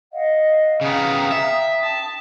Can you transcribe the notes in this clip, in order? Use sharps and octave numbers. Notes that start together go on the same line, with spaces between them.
D#5 F5 F#5
C#3 B3 F5 G5 A#5 D#6
E5
A5